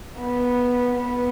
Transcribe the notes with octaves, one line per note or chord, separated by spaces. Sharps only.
B3
B3